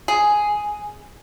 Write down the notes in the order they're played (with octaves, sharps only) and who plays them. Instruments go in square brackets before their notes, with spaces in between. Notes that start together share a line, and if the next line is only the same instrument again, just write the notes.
[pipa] G#4